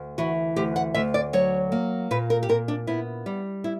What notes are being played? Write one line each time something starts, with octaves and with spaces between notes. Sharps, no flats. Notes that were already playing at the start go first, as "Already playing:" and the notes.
Already playing: D2
E3 F#4
D2 G4
F#5
D2 E5
D5
F#3 C#5
A#3
A#2 B4
A#4
G4
A#2 A#4
D4
B3 E4
G3
E4